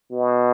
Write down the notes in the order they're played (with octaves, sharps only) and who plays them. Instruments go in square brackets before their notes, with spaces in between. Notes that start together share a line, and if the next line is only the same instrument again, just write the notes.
[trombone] B2